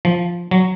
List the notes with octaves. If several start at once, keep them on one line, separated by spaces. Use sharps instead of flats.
F3
F#3